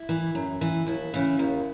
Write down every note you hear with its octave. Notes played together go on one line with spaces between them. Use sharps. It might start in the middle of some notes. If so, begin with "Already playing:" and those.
Already playing: E4
E3
F#2
E3
D#2 E4
C#3 E3
D#2